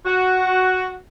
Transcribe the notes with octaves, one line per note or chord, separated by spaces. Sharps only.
F#4